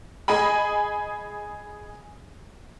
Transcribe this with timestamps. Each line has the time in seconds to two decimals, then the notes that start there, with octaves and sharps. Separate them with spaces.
0.28 G#4 D#5 G#5 B5